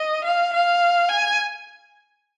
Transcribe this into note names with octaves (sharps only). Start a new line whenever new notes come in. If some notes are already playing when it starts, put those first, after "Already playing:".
Already playing: D#5
F5
F5
G#5